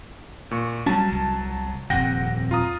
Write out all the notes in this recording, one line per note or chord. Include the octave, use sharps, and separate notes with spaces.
A#2 C#6
F#3 G3 C#4 A5
C2
D#1 F2 C3 F#5 G5 A#6
F4 A#5 D#6